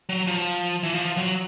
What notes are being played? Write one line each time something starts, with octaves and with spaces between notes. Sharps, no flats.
F#3
F3
E3
F3
F#3